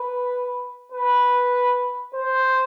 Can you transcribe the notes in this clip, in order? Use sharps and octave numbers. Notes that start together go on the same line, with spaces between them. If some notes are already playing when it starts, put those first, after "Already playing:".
Already playing: B4
B4
C5